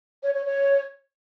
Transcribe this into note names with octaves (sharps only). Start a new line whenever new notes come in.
C#5
C#5
C#5